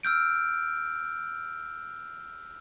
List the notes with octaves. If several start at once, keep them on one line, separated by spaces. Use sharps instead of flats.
E6 F6 G6 D7